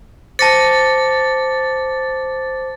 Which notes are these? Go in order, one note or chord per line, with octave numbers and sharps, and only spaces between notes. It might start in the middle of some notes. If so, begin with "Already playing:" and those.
C5 A5 D6 A6 A#6 C#7